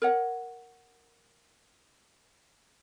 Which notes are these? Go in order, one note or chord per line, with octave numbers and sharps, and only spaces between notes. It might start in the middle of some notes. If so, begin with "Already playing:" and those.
A#4 C#5 F#5